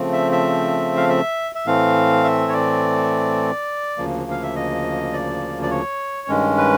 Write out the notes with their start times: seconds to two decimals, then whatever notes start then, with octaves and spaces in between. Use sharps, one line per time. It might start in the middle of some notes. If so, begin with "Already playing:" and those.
Already playing: C#3 F3 A3 C4
0.13 E5
0.32 E5
0.97 F5
1.09 E5
1.55 E5
1.66 A2 E3 A3 C4 F5
2.24 E5
2.48 C#5
2.53 D5
3.98 D2 C#3 F3 A#3
4.31 F5
4.43 E5
4.56 D#5
5.13 D5
5.62 D5
5.71 C#5
6.28 G2 D#3 G#3 C#4
6.57 B4